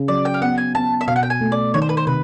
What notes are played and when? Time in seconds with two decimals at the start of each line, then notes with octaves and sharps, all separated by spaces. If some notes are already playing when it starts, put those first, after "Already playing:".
Already playing: C#3
0.08 F#3 D5
0.25 G5
0.34 F5
0.41 B3 F#5
0.58 G#5
0.75 B3 A5
1.01 E5
1.07 B2 F5
1.16 F#5
1.23 G5
1.30 G#5
1.41 A3
1.52 D5
1.74 D#3 C#5
1.82 C5
1.89 B4
1.97 C5
2.07 C3 B4